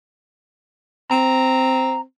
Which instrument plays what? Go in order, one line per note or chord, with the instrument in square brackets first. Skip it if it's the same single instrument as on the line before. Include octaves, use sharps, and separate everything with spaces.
[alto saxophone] C4 [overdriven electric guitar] A#5